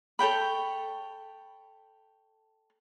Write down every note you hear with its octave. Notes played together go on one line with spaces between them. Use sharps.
A4 C#5 G5 B5